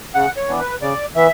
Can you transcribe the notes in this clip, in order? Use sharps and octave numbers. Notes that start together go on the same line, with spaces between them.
C#3 F#5
C#5
E3 B3 D4
B4
C#3 D5
E3 B3 E5